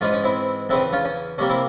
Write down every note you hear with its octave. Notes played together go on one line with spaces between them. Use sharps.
G#2 E3 G#3 C#4 F4
C#4
C4 E4
E2 C#3 E3 C4 E4
C#4 F4
C#4
C3 G3 A#3 C#4
C4 E4